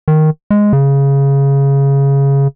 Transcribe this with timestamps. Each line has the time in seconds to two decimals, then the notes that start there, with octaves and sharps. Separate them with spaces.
0.08 D#3
0.51 G#3
0.73 C#3